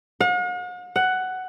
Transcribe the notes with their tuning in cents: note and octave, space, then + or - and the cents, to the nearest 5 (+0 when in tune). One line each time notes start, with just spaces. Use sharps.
F#5 -45
F#5 +10